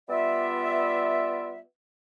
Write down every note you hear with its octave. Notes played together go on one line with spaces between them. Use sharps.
G3 B3 F4 D5 E5